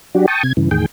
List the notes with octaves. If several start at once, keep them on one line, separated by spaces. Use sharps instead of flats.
F#3 D4 F#4 G4
G5 A5 C#6 D#6
C3 G#6
G2 C#3 E3
E2 A2 D#3 G#4 G5